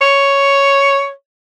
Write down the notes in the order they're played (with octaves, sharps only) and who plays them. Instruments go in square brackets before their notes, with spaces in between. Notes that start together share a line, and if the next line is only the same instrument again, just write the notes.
[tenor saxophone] C#5